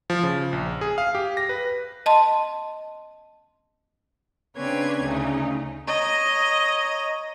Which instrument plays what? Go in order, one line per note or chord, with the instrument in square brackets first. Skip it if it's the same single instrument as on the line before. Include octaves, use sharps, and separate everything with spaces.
[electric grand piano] F3
C#3
A#1
G#4
F5
G4
A#6
B4
[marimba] D#5 A5 C6
[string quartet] C#3 C4 D4 B4 C#5 G#6
D2 C#3 A3 D#4
[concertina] C#5 A#5 [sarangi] D#5